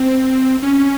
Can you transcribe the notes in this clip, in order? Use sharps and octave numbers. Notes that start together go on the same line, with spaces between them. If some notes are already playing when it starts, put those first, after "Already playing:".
Already playing: C4
C#4